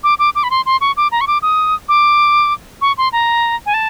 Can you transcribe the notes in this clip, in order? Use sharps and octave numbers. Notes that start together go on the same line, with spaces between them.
D6
D6
D6
B5
C6
C6
C#6
D6
A#5
C#6
D6
D#6
D6
C#6
C6
A#5
G#5
A5